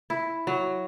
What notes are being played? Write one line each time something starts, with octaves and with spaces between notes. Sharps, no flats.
E4
F#3